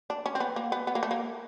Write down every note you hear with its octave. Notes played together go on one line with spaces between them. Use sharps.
D4
C#4
C4
B3
A#3
B3
B3
A#3
A3
A#3